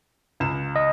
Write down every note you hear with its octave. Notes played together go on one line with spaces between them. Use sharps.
C#2 E7
D#5